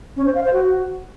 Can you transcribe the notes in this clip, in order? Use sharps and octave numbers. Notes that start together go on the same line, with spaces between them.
C#4
C5
F5
C5
F#4